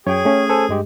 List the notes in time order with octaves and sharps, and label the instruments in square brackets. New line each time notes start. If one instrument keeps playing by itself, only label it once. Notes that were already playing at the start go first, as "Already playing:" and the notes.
[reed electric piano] F#2 [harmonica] G#4 [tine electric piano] C#5 G5
[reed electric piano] A3 C#4
[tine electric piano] A4 C5 G#5
G2 G#3 G4